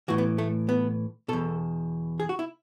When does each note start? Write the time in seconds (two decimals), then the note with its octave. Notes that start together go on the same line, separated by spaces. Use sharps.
0.08 A2 E3 F#4
0.18 B3
0.38 A3
0.69 B3
1.28 E2 B2 A4
2.20 G#4
2.29 F#4
2.39 E4